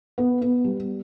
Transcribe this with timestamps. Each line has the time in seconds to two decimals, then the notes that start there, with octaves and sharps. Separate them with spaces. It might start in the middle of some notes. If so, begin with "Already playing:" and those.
0.18 B3
0.41 B3
0.64 G3